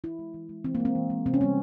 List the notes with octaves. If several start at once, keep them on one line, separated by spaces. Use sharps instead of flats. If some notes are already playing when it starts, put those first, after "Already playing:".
E3 E4
G#3
E3
G#3
E3 C4
A#3
G#3
C4
E3
G#3
C3 C4
C#4
G3 A#3 C4